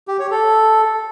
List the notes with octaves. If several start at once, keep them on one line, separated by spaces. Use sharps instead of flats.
G4
C#5
A4